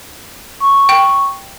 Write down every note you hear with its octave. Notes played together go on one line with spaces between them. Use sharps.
C#6
G5